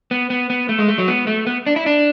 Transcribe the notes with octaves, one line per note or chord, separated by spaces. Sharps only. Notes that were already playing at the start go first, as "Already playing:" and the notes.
B3
B3
B3
A3
G#3
A3
F#3
B3
A3
B3
D4
E4
D4